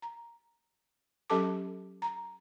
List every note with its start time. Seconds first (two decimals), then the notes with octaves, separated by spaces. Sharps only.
0.02 A#5
1.30 F#3 C#4 G4 A4 A5 D6
2.02 A#5